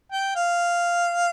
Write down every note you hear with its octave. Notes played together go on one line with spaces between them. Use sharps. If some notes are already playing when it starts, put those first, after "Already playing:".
G5
F5